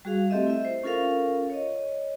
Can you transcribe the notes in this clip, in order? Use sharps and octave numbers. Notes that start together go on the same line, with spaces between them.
G3 F#4 G#4 F5
A3 C4 G4 A4 D#5 E5
E4 E5
C5
C#4 F4 A4 A#4 F5
C#5 D#5